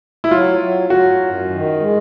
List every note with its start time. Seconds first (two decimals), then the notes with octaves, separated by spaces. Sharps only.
0.24 E4
0.31 F#3 F4
0.61 F#3
0.90 F#3 F#4
1.20 F#2
1.50 D#3
1.80 G#3